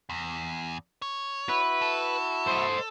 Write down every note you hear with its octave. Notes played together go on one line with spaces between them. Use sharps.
E2
C#5
E4 F#4 B4 E5
A4
C5 D#5